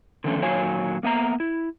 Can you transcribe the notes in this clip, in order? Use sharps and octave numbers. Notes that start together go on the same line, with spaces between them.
D3 D#3 F3 A3 B3 C#4
A#2 D#3 F#3 C#5 F5 G#5
A#3 B3 E5 A#5
E4